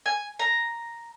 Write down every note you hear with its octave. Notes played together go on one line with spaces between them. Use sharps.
G#5
A#5